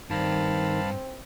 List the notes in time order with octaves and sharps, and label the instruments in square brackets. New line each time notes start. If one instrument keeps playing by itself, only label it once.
[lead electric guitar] G2 [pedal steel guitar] D#3 [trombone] C4 [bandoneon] F5 A5 B5